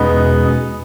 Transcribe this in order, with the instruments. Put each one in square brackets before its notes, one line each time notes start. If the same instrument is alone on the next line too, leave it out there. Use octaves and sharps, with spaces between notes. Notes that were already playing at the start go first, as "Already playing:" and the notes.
Already playing: [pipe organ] E2 B2 G#3 C#4 G#4 [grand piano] B3 D#4